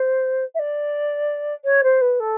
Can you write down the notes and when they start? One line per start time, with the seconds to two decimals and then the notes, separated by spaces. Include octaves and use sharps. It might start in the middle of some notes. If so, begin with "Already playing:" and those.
Already playing: C5
0.55 E5
0.59 D5
1.65 C#5
1.83 C5
2.01 B4
2.20 A4